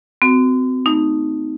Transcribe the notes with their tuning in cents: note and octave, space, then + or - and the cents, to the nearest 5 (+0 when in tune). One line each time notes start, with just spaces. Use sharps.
C4 -35 F#4 +0
A3 +0 D#4 +0